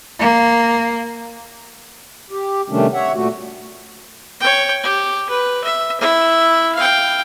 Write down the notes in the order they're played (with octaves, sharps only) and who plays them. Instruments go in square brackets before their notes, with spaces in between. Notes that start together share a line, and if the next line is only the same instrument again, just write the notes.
[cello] A#3
[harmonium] G4
C3 D#3 G3 A3 C#4 D4
C#5 E5 F#5
A#2 A3 F#4
[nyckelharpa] C#5 G5
G4
B4
E5
E4 E5
F5 G5